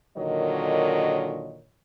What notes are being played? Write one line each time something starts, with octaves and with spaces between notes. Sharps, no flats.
A#2 D3 D#3 F#3 C#5 D#5